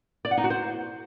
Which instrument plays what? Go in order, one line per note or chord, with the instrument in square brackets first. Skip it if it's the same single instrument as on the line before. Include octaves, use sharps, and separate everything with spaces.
[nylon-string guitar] D5
F#5
D#4
F#4
C5